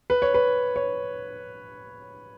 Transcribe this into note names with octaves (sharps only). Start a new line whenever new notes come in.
B4
C#5
B4
C#5